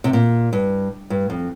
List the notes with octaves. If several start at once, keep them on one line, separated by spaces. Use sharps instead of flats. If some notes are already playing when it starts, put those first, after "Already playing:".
C3
A#2
G2
G2
F2